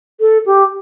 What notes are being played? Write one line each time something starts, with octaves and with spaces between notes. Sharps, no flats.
A4
G4